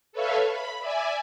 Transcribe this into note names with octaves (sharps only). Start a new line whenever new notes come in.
A4 B4 C#5 E5 F5
B5
D5 E5 G#5